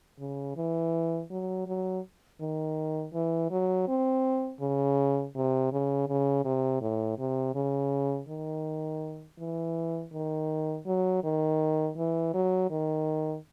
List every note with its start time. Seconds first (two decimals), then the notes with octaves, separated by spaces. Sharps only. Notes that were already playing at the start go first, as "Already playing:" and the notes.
0.19 C#3
0.56 E3
1.30 F#3
1.66 F#3
2.41 D#3
3.13 E3
3.51 F#3
3.88 C4
4.61 C#3
5.35 C3
5.72 C#3
6.08 C#3
6.45 C3
6.81 A2
7.18 C3
7.55 C#3
8.28 D#3
9.39 E3
10.13 D#3
10.86 F#3
11.24 D#3
11.97 E3
12.34 F#3
12.70 D#3